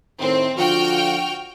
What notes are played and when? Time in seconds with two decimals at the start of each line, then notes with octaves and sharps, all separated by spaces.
0.20 A2 D#3 C4
0.57 D3 F3 F4 F#4 G5 F6